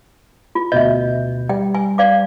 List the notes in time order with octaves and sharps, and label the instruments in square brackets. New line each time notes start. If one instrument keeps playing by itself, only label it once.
[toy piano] F4
[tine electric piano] D2 B2 G6 [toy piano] D#5 E5
[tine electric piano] G3 [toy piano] G5
[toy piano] G#5
D5 F5 D6